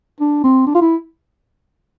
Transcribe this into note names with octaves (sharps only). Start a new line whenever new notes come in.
D4
C4
D4
F4
E4